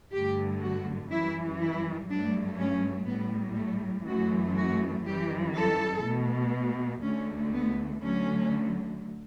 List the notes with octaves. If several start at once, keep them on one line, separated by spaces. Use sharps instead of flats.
G2 D3 A3 G4
F#4
F#2 E3 G3 E4
E4
G2 F#3 A3 D4
C#4
A2 G3 B3
A3
F#2 E3 A3 F#4
F#4
F#2 E3 G3 G4
A4
B2 A3
D2 D3 A3 C#4
B3
D2 D3 F#3 A3 C#4